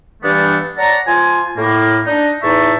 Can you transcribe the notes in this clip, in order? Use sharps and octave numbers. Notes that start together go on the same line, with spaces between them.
G2 E3 G3 A3 B3 D4
C#5 D5 F#5 A5 A#5
F3 F4 C5 G#5
A2 A#3
D4 D#4
E2 A2 D#4 E5 A5 C#6